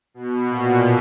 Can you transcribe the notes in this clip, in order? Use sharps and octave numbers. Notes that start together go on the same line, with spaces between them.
B2
A#2